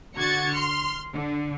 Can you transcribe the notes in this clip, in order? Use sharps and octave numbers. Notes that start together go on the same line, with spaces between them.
D3 F#4 G#6 A6 C#7
C6 F6
D3